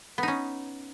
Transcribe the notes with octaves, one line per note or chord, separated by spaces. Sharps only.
B3 C#4 D#4